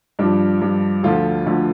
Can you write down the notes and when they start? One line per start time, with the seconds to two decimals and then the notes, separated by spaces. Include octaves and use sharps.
0.19 G2 F3 D4
0.61 G2 F3
1.03 D2 D3 F3 F4
1.46 D2 D3 F3